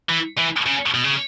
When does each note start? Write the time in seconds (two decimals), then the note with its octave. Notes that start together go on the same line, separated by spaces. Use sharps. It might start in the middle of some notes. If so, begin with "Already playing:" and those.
0.10 E3
0.38 E3
0.66 C#3
0.94 B2
1.04 C#3